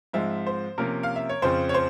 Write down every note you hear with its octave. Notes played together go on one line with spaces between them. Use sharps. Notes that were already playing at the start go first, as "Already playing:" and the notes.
G#2 F3 G#3 C4 E5
C5
C3 F3 A#3 C#4 A#4
F5
E5
C#5
F2 C#3 F3 C4 C5
C#5
C5